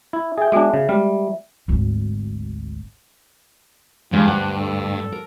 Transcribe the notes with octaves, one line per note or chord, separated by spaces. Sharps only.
E4
G#4 E5 G5
G#3 B3 D4 F#4 G5
C#3
G3 G#3
G#1 D2
E2 G2 G#3 D4 F4
D2 D3 F#5 A5
A4
A#4